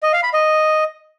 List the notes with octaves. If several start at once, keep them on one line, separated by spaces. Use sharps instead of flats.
D#5
F5
B5
D#5